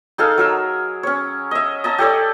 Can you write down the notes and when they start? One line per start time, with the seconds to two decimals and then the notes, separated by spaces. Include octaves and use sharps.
0.18 D#4 G#4 A4 F5
0.38 F#3 A#4 E6
1.03 C#4 C#5
1.51 D#5 E5
1.84 D#5 A5 A#5
1.98 G4 A4 C#5 D5